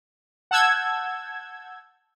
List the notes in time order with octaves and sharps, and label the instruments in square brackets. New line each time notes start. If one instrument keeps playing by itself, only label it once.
[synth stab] F#5 A5 E6 G6 G#6